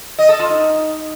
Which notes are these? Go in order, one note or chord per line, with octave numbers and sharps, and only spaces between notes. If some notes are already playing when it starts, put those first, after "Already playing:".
D#5
A4
F4
D#4